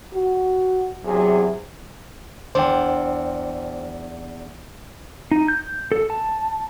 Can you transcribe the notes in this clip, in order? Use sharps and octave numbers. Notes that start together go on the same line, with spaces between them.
F#4
E2 C3 F#3 G#4
E2 D4 C5 G5
D#4
G6
A4
A5